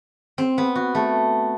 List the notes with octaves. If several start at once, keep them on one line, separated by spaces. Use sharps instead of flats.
C4
B3
F#4
A3